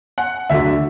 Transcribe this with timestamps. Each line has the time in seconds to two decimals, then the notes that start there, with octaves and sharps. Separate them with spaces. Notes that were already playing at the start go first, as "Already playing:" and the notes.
0.18 F#5
0.50 D2 D3 F#3 E5